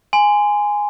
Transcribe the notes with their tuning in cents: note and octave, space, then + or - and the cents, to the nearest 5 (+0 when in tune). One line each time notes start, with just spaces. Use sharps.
G#5 -5 C6 -25